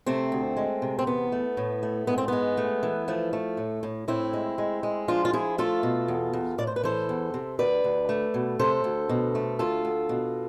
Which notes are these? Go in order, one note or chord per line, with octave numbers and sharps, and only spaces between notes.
C3 A3 C4
D2
G#3
C3
C4
E2 B3
A3
A2
A3
G#2 B3
C4
G#3 B3
A3
E3
F3 A3
A3
A2
A2
A2 C4 E4
G#3
G#3
G#3
F3 D4 F4
F4
F3 E4 G#4
A3 F4 A4
B2
E2
E2
A2 D5
C5
B4
E3 A4 C5
E2
C3
D2 B4 D5
D2
A3
B2
C3 A4 C5
D2
B2
A3
D2 F4 A4
D2
B2